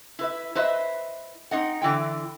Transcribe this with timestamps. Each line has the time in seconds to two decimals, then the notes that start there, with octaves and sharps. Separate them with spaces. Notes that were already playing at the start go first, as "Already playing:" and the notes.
0.19 E4 B4 E5
0.55 E4 B4 C5 D#5 E5
1.51 C4 D#4 D#5 F#5
1.82 D3 E3 E4 G5